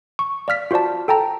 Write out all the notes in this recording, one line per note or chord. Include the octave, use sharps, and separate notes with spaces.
C#6
D5 F5 F6 B6
F4 F#4 C5 D5 A5
A4 G5 A5 A#5